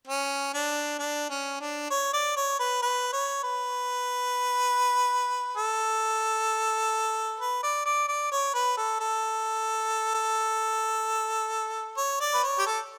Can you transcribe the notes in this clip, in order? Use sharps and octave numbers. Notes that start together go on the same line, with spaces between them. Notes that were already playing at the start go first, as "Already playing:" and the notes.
C#4
D4
D4
C#4
D4
C#5
D5
C#5
B4
B4
C#5
B4
A4
B4
D5
D5
D5
C#5
B4
A4
A4
A4
C#5
D5
B4
C#5
G4
A4